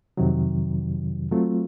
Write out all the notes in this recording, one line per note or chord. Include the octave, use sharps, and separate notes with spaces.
F2 C3 D#3 F#3
F#3 A3 C4 F4